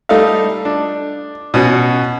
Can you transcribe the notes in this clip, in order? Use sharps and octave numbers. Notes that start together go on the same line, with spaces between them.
G3 A3 D#4 A4 F5
D4
B2 C#4 F#4